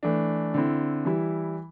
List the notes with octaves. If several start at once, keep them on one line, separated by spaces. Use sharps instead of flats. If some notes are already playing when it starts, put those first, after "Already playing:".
E3 A3 D4
D3 C4 E4
E3 G3 E4